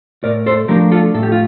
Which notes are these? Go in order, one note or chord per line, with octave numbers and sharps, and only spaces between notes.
A2 A#4 D5
A4 C5
F3 A3 D4 G4 A#4
F4 A4
A2 A4
G4
F4